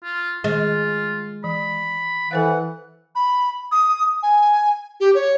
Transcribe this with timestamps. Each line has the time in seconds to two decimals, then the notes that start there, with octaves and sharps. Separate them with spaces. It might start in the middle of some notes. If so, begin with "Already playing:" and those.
0.04 F4
0.44 D#3 G#3 F4
1.44 E3 B5
2.31 E3 A4 C5 F5 F#5
3.15 B5
3.72 D#6
4.23 G#5
5.00 G4
5.15 C#5